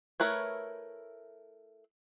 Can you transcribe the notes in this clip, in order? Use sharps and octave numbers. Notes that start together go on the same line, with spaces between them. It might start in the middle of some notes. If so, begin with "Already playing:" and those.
A3 E4 A#4 B4 C#5